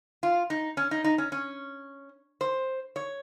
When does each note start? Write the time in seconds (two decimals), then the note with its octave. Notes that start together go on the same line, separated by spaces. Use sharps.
0.23 F4
0.50 D#4
0.77 C#4
0.91 D#4
1.04 D#4
1.18 C#4
1.32 C#4
2.41 C5
2.96 C#5